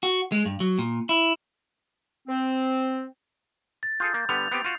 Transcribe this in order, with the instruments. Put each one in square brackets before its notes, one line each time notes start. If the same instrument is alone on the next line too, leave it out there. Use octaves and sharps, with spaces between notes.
[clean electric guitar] F#4
G#3
G2
F#3
A#2
E4
[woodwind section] C4
[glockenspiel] A6
[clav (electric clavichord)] F4 G#4 A4 [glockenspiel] G6
[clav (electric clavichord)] A#3
[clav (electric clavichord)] D3 G3 B3 [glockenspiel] F7
[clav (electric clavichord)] B3 C4 G4
[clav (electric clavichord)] F4 F#4 [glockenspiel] C7